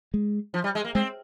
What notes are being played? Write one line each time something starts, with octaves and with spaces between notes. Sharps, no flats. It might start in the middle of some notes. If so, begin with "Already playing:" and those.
G#3
F3
G3
G#3
A#3
G#3 C4